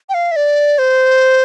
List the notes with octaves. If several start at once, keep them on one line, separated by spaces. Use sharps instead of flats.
G5
F5
E5
D5
C5